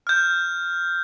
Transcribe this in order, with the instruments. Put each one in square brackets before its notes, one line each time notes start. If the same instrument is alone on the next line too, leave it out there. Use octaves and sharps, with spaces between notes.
[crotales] F6 G6